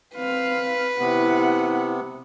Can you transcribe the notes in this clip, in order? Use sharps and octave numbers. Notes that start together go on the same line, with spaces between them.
C4 B4 F5
C3 B3 E4 F#5